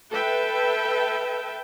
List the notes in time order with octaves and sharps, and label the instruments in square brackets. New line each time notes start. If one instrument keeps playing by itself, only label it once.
[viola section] A4 B4 E5 G5